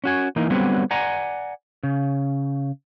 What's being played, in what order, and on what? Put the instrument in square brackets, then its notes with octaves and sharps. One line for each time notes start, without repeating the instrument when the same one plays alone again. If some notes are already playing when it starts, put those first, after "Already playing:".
[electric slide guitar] C#4 F#4 G#5
E3 A#3 D#4
D3 F#3 G3 B3 C4
D5 F#5 G#5 A#5
C#3